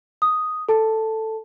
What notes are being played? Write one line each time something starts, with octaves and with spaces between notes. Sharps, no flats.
D#6
A4 A5